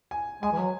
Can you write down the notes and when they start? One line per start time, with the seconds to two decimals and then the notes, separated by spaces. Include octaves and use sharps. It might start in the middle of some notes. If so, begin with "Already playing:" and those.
0.11 G#5
0.42 G#3 G#5
0.52 E3
0.58 F#3